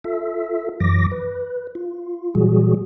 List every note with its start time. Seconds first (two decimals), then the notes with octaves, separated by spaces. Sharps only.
0.04 F4 A4 E5
0.80 F#2 E3 F#3 D6 A#6
1.11 B4
1.75 F4
2.35 A#2 E3 F#3 G3 F#4 G#4